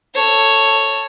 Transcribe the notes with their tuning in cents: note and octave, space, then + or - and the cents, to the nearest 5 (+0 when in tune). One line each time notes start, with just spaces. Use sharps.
A4 +15 C#5 +0